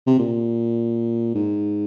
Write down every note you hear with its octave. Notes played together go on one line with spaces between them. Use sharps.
C3
A#2
G#2